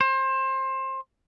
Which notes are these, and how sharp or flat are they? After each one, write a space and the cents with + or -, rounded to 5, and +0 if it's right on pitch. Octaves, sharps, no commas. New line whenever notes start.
C5 +25